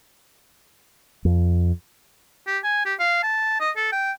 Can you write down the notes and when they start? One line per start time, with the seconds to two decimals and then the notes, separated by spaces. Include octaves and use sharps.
1.25 F2
2.47 G4
2.64 G#5
2.86 G4
2.99 F5
3.23 A5
3.60 D#5
3.77 A4
3.92 G5